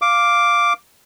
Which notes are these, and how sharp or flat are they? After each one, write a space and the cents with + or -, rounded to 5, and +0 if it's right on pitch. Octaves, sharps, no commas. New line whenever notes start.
F5 +0 D6 +0